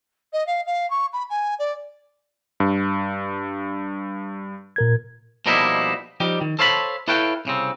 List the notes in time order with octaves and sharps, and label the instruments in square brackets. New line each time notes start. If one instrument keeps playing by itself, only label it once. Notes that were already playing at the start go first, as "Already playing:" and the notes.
[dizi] D#5
F5
F5
C#6
B5
G#5
D5
[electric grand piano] G2
[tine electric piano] A#2 A#4 G#6
[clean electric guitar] B2 F3 G3 A#3 D#4 E4
F3 G3 D#4 G4
D#3
A4 C5 C#5 F5 A5 B5
E4 A4 B4 C#5 F5 G5
C2 C#3 C4